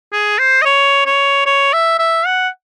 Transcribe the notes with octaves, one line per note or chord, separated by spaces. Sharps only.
G#4
C5
D#5
C#5
C#5
C#5
E5
E5
F#5